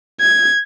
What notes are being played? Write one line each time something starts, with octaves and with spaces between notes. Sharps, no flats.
G#6